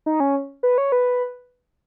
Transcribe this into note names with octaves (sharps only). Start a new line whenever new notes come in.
D#4
C#4
B4
C#5
B4